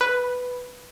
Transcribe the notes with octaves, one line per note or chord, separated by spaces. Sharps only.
B4